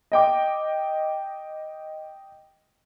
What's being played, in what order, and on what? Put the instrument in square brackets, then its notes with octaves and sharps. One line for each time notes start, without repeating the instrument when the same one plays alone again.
[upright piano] D#5 G5 D6